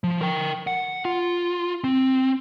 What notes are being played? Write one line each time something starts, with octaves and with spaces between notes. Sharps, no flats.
F3
A#4 G5
F#5
F4
C4